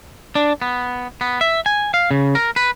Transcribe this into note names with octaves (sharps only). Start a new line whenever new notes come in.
D4
B3
B3
E5
G#5
F5
C#3
A#4
B4